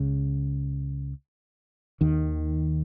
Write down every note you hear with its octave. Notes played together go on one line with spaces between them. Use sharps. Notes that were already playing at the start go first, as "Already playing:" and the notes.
Already playing: C#2 C#3
D#2 D#3